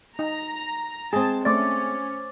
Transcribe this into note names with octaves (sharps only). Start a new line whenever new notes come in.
D#4 A#5
G#3 C4 G#4 A5
A3 C#4 C5 D5 D6 A6